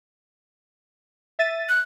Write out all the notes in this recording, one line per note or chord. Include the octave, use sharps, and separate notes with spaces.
E5 A6 D#7
F#6